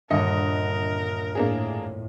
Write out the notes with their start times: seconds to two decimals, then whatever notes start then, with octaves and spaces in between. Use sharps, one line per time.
0.10 D#1 G2 D3 A#4 D#5 C#7
1.35 A2 A#3 D4 G#4